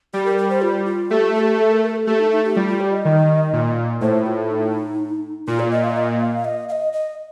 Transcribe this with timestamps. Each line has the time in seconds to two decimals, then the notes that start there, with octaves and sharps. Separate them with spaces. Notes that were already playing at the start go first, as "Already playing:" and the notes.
0.14 G3 G4
0.25 A#4
0.38 A#4
0.50 C5
0.62 F4
0.86 F4
1.10 A3 G4
1.35 A4
1.40 G4
1.59 A4
1.71 A#4
1.83 A#4
1.96 A4
2.07 A3 G4
2.20 D#4
2.31 D#4
2.44 G4
2.56 G3 F4
2.68 F4
2.80 D5
2.92 D#5
3.05 D#3
3.53 A#2
4.01 A2 C5
4.26 F4
4.50 D#4
5.47 A#2 F4
5.59 D5
5.71 D#5
5.84 F5
5.96 D#5
6.20 F5
6.45 D#5
6.69 F5
6.72 D#5
6.93 D#5